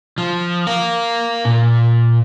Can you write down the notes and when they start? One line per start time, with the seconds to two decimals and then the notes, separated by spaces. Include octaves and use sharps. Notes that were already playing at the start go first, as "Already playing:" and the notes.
0.18 F3
0.67 A#4 F5
1.45 A#2